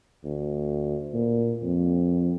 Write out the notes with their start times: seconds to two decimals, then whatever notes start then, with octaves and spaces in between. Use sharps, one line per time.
0.25 D2
1.14 A#2
1.63 F2